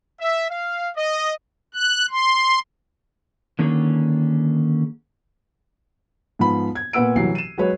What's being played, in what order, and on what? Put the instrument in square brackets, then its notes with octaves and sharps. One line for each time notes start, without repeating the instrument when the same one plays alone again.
[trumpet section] E5
F5
D#5
[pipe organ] F#6
C6
[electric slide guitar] D3 D#3 A#3 C#4 F4 G#4
[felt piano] G#2 F3 B3 B5
G#6
A#2 B3 B4 F#5 E6 D7
C2 E3 F#3 C7
D#7 E7
F#3 G#3 F#4 B4 C#5